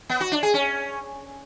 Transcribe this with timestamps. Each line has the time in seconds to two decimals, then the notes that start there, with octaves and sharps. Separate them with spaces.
0.09 B3
0.21 F#4
0.32 D4
0.43 G#4
0.54 C#4